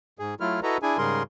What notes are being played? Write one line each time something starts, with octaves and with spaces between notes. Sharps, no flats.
G#2 G#4
F#3 A3 E4 F4 F6
E4 F#4 A4 B4 D#5 A#5
D4 E4 G#4 G#5
G#2 C#3 G3 G#4 A#4 C6